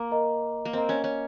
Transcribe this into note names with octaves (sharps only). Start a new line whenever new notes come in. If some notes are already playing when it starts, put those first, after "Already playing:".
Already playing: A#3
A#4 D#5 A#5
A#3
C4 A#4 D#5 A#5
C#4
C#4